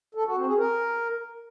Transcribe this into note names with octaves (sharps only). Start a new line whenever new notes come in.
A4
F#4
C4
G#4
A#4